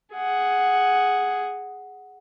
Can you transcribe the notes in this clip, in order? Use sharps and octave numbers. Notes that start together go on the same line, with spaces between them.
G#4 F#5